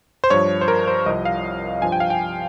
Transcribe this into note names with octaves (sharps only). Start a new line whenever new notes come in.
C5
G2 F3 C#5
C5
A#4
C5
C2 C3 F3 D#5
F5
G2 F3 G#5
G5
F5
G5